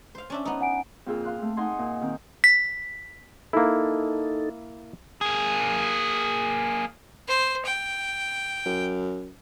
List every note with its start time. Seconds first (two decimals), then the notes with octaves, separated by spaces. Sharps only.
0.15 C5 F5
0.30 C#4 D4 E5
0.45 B3 D#4
0.61 F#5 G#5 D7
1.06 F2 A#2 F4 G#4 E6
1.24 F5 C6 F#6
1.42 A3
1.57 D#4 D#5 F#5 G#5 C6
1.79 A#2
2.01 D#3 C4
2.44 B6
3.53 A#3 D#4 E4 A4
5.21 A#3 G#4
7.28 C5
7.66 G5
8.66 F#2